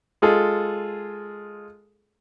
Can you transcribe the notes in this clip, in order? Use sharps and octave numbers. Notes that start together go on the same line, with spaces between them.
G#3 F4 G#4 A4